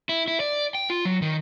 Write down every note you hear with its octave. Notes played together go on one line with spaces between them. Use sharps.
E4
E4
D5
G5
F4
F#3
D#3